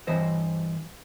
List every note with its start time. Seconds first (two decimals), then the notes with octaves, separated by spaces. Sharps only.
0.07 G2 E3 C5 D#5